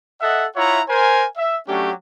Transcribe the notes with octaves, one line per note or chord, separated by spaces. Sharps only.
A4 D#5 E5 F#5
E4 F4 C#5 E5 F#5 A#5
A#4 C5 G#5
E5
F#3 A3 C#4 D4 G4